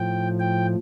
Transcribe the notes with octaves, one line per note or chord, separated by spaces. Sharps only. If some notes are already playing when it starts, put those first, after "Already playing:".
Already playing: A2 F3 G5
G5